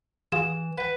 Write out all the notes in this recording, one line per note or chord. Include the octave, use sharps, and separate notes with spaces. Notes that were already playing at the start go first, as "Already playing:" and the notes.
E3 F4 F#4 G#4 E7
B4 F#5 G5